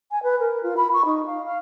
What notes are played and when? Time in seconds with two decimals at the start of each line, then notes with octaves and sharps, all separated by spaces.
0.11 G#5
0.23 B4
0.40 A#4
0.63 F4
0.77 B5
0.93 C#6
1.05 D#4
1.26 F5
1.45 F5